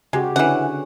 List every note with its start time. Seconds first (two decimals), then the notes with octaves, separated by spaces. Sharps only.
0.13 C#3 G#3 F#4 G4
0.36 D3 E3 C#4 F#5